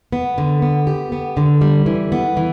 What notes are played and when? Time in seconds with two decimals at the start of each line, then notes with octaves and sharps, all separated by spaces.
0.13 B3
0.38 D3
0.62 B3
0.87 G4
1.12 B3
1.37 D3
1.61 G3
1.86 E3
2.12 B3
2.37 E3